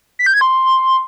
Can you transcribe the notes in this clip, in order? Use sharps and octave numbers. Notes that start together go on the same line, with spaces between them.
B6
G6
G#6
C6